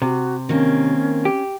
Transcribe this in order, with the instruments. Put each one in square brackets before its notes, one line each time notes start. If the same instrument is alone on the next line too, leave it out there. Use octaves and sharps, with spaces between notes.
[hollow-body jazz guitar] C3 [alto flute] F#4
[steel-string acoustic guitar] D#3 A#3 C4 [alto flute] C#4
[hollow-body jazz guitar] G4